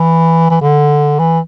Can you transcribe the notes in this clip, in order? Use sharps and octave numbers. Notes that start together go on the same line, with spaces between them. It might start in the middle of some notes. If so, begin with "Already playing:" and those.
Already playing: E3
E3
D3
E3